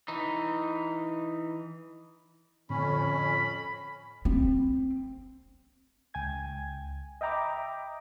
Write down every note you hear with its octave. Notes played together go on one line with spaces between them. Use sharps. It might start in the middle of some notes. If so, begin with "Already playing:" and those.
E3 D#4
F2 A2 D3 C4 C#4 B5
C4
C#2 G5 G#5 G#6
D#5 E5 G5 A#5 B5 D6